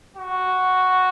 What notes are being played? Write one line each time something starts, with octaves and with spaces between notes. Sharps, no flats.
F#4